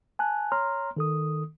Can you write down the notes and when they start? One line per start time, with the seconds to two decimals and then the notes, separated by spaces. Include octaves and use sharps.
0.19 G#5 A5 F#6
0.52 C#5 A#5 C6 F6
0.97 D#3 A4 D#6